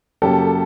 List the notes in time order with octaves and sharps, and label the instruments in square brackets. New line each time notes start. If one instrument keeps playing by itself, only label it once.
[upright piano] F#2 C#3 F#3 A#3 [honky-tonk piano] G4 A4